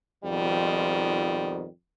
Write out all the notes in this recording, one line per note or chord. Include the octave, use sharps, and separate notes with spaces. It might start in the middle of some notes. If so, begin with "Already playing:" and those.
F2 G#2 B2 D#3 F3 G3